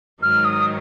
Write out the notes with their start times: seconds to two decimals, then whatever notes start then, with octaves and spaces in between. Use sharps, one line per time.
0.22 G#2 D#3 F#3 F6
0.45 D#6